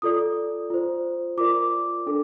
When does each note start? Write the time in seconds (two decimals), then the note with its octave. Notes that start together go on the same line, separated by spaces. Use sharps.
0.02 F4 A4 D5 D#6
0.70 F4 C5
1.37 F4 A#4 D5 D6
2.06 D4 A4